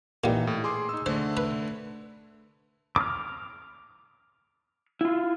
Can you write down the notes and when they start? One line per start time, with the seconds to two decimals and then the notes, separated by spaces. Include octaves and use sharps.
0.24 A#2 E3 G3 D#4
0.47 A2
0.64 G#4 C6 D6
0.89 D#4 E6
1.06 D3 A3 C5
1.37 B4
2.96 D6 F6
5.01 E4 F4